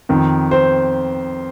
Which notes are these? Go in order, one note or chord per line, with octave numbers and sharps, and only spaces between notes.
F2 D#3
C5